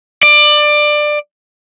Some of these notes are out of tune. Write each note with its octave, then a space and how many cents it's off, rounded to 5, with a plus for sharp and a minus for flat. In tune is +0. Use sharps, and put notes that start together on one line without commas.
D5 +20